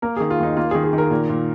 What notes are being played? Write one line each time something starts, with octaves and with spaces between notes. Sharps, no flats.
A#3 A#4
D#3 G#4
F4
D#2 D#4
A#3 F4
G#4
D#3
G#4
D#3
A#4
A#2
A#2